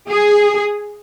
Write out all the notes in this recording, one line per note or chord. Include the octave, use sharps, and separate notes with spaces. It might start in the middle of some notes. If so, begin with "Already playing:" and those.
G#4